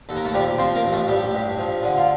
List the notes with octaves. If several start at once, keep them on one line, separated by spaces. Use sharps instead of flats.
D#2 A4
A#4
A3 A4
F3 G3 G4
F3 C4 C5
A#3 A#4
A1
A3 A4
A1 G3 G4
G2
F3
D3
F4